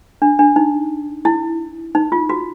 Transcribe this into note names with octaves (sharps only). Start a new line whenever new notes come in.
D4
D4
D#4
E4
D#4
F4
F#4